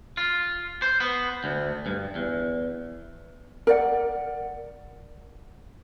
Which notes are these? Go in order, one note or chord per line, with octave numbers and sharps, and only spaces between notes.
F4
C5
B3
D2
G2
E2
A#4 D5 F#5